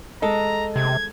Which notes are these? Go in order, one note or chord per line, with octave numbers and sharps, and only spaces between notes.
G#3 A4 D#5 A#5
C3 G#6